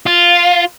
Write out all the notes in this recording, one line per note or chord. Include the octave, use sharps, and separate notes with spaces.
F4